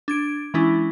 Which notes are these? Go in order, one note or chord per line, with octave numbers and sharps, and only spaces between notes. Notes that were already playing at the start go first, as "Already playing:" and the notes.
D4 G#6 D7
E3 G#3 C#4 D4 E4